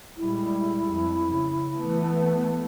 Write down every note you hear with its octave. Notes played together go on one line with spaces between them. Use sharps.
A#2 G3 G#3 E4
F2
C#3
E3 A3 B3